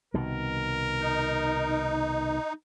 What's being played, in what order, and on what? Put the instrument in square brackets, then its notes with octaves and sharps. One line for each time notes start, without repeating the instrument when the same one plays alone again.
[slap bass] C2 B2 D#3 [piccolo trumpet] A#4
[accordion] D#4